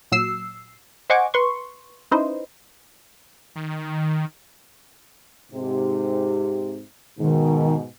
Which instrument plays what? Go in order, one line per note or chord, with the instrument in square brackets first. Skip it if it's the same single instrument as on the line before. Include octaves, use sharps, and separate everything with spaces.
[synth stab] A#2 F#3 E6 C7
C5 D#5 F#5 G#5 C#6 D6
B4 C6 C#6
C#4 D#4 E4 B4 C5 D#5
[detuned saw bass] D#3
[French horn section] G#2 C3
[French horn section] G#2 B2 [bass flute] D#3